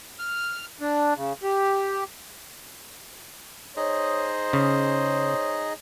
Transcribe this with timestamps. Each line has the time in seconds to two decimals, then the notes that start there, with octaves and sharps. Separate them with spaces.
0.19 F6
0.81 D4
1.16 C#3
1.43 G4
3.77 D#4 G#4 C5 C#5 D#5
4.53 C#3 C#5